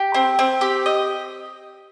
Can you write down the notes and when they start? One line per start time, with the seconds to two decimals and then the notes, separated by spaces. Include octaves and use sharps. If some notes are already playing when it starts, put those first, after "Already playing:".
Already playing: G4
0.14 C4
0.39 C4
0.61 G4
0.86 D#5